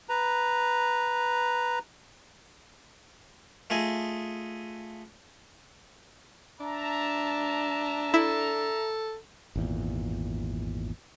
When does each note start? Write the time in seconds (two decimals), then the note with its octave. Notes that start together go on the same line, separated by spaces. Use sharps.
0.09 B4 A#5
3.70 A3 F4 G#4 D#5 G#5
6.60 D4 E5 A5 A#5
8.14 E4 A4
9.56 G#1 E2 A#2